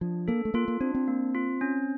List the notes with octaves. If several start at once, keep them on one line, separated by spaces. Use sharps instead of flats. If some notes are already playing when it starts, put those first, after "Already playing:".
F3 D4
A#3 A4
A3
A#3 F4
A#3
C4 D4
C4
A#3
F4
C#4